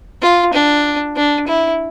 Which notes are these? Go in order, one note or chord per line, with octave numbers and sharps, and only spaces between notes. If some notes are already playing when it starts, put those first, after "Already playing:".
F4
D4
D4
E4